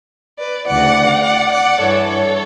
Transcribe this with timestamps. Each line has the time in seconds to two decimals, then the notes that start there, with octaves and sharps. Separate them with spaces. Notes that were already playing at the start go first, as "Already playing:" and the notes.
0.39 B4 D5
0.66 D2 C#3 E3 D5 F#5
1.23 D5 F#5
1.51 D5 F#5
1.80 G2 E3 A4 C#5
2.08 A4 C#5